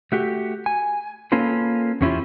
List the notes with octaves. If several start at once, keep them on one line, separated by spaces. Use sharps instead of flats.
A3 F#4 G4
G#5
A#3 C#4 F4 A4 B4
E2 A#3 C#4 E4 F4 G4